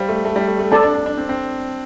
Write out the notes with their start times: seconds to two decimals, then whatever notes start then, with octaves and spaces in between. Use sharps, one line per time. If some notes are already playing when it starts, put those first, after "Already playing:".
Already playing: G3 C5 F5
0.09 A3
0.25 A3
0.36 G3
0.48 A3
0.59 A3
0.71 C4 A4 D5 A5
0.83 D4
0.95 D4
1.06 D4
1.18 C4
1.29 C4